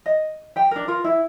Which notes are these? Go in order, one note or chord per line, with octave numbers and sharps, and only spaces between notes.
D#5
G4 G5
D4 A#4
F4 A#4
E4